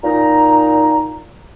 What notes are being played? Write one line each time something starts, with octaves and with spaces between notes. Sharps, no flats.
A#2 D#4 A#5